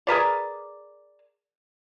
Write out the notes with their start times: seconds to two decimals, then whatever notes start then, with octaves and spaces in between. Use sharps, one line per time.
0.07 G#4 A#4 B4 D5